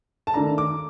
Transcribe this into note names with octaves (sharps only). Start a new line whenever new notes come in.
A5
D#3 A3 D4 A#5
D6